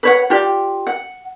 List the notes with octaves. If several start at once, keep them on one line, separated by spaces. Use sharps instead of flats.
B4 C#5 F#5
F4 G4 D5
F#5